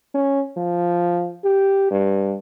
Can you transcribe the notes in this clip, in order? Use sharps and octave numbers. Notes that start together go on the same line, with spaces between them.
C#4
F3
G4
G2